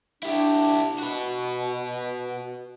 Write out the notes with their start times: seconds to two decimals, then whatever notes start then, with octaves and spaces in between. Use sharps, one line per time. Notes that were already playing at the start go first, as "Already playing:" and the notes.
0.23 D4 E4 G4
0.98 B2 F#4 B4